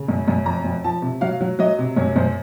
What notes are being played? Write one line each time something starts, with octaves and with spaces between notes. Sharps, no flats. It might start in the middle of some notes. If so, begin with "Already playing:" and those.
Already playing: C#3
F#2
F#2
F2 A#5
F2
F3 A5
C3
F#3 F5
F#3
F#3 D#5
C3
F#2 C#5
F#2 C5